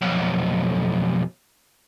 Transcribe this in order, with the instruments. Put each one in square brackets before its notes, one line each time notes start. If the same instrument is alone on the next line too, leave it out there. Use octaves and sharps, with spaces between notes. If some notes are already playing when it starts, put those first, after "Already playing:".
[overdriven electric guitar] B1 F2